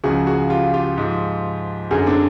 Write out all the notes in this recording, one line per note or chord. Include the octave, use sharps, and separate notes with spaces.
C#2 C#3 F3 F#4 G#4
F#4 G#4
F4 G4
F4 G4
G#2 F3
F#2 D3 F#3 F#4 G#4
C4 D4